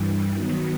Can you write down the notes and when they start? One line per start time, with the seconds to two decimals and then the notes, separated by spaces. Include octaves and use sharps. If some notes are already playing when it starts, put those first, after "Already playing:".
Already playing: G2 E3 G3
0.32 D#3 F#3 B3